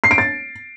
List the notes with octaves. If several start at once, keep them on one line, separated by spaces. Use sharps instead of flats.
C7
D7
A6